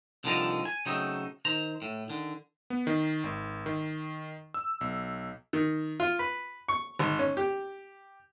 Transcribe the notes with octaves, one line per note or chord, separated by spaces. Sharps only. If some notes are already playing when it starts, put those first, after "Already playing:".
C2 D3 D#3 F3 A5 A#5
G#5
C#3 F#3 A3 C4 D#4
D#3 C5 A#5
A2
D3 D#3
B3
D#3
G#1
D#3
E6
B1
D#3
F4
B4
C#6
G#1
C#4
G4